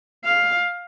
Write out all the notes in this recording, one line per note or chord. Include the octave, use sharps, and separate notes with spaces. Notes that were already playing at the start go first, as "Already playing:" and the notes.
F5